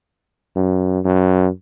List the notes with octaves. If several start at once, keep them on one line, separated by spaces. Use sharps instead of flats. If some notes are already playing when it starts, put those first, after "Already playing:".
F#2
F#2